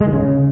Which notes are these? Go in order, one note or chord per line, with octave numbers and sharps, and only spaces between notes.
G#3
D#3
C#3